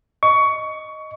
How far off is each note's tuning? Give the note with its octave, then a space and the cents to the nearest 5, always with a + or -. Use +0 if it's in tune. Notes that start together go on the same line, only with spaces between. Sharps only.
D#5 +0 C#6 +20